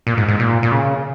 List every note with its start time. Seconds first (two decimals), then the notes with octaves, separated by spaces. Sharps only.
0.07 A#2
0.17 G#2
0.28 G#2
0.39 A#2
0.63 A#2
0.72 C#3